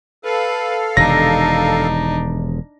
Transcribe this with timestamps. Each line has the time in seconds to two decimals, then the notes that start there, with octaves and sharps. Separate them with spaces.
0.24 A4 B4 F5
0.97 E1 C3 D#3 D4 D#4 A#6